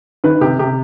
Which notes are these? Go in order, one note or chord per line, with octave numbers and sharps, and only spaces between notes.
D#3 B4
C3 G4
C3 G4